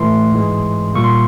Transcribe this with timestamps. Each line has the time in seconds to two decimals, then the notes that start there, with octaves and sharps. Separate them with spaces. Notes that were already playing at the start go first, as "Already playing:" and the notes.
Already playing: A2 E3 A3 C6
0.32 G#2 E3 G#3
0.94 A#2 G3 A#3 C#6
1.04 C6